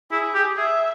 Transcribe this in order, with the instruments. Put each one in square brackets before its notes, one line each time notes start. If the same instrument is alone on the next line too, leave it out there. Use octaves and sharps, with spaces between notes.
[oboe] E4 [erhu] G#4
[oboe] G4
[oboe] G#4 [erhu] E5